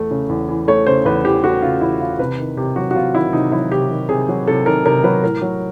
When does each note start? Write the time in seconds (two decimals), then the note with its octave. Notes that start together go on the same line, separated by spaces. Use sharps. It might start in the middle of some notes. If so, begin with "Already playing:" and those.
Already playing: E2 E3 A3
0.11 C#3
0.29 E2
0.49 E3
0.68 A3 C#5
0.86 C#3 C5
1.05 E2 B4
1.25 E3 G4
1.44 A3 F#4
1.62 C#3 F4
1.81 E2 E4
2.00 E3 F4
2.19 C3 B4
2.38 D#3
2.57 C3 G4
2.76 F#3 F#4
2.91 F#4
2.95 C3 F4
3.15 D#3 E4
3.33 C3 D#4
3.52 F#3 E4
3.71 C3 G4
3.90 D#3
4.09 C3 G#4
4.29 F#3
4.47 C3 A4
4.66 D#3 A#4
4.86 C3 A#4
5.04 F#3 B4
5.23 A2 A#4
5.42 F#3